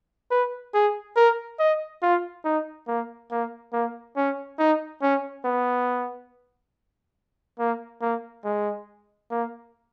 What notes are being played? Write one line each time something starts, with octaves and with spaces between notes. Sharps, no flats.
B4
G#4
A#4
D#5
F4
D#4
A#3
A#3
A#3
C#4
D#4
C#4
B3
A#3
A#3
G#3
A#3